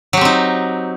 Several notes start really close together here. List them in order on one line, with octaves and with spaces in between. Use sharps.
F#3 G4 C4 D#4